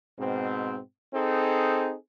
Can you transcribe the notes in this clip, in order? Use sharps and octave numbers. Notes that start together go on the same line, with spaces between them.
G#2 B2 C4
C4 D#4 G#4 A4